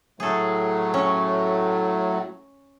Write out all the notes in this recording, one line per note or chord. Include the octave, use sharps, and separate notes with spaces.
A2 F#3 A3 G#4 A4
C#4